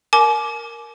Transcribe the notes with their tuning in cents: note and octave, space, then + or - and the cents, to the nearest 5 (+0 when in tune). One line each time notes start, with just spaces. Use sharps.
A#4 +0 G#5 +45 D6 +0